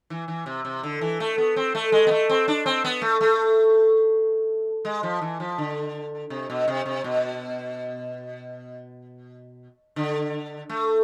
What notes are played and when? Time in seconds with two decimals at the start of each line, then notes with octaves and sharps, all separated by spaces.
0.10 E3
0.28 E3
0.46 C3
0.65 C3
0.83 D3
1.01 E3
1.20 A3
1.38 B3
1.56 C4
1.75 A3
1.92 G#3
2.07 B3
2.11 A3
2.29 C4
2.48 D4
2.66 C4
2.84 B3
3.02 A3
3.21 A3
4.85 G#3
5.03 F3
5.22 E3
5.40 F3
5.58 D3
6.30 C3
6.50 B2
6.68 C3
6.86 C3
7.04 B2
9.96 D3
10.70 A3